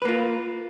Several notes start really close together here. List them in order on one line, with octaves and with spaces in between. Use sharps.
B4 A#3 F4